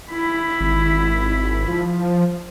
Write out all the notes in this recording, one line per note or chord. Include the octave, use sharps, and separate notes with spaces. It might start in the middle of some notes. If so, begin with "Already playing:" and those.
E4 B5
G#1
F3